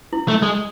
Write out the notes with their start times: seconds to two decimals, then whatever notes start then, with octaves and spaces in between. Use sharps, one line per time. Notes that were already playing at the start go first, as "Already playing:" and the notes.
0.13 E4
0.28 A3
0.43 G#3